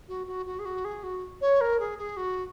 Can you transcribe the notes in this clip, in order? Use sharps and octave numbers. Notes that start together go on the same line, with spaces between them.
F#4
F#4
F#4
G#4
F#4
G#4
F#4
C#5
A#4
G#4
G#4
F#4